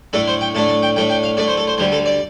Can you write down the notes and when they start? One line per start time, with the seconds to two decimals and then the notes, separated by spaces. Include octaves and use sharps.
0.13 A2 A3 D4 A4
0.28 C5
0.41 G5
0.55 A2 A3 D4 A5
0.68 A5
0.83 G5
0.96 A2 A3 D4 G5
1.10 G5
1.23 F5
1.37 A2 A3 D4 D5
1.48 C5
1.57 A4
1.68 C5
1.78 D2 D3 G3 C5
1.92 A4
2.06 D5